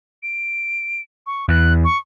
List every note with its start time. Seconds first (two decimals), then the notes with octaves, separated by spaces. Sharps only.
0.23 D7
1.27 C#6
1.49 E2 F#6
1.85 C#6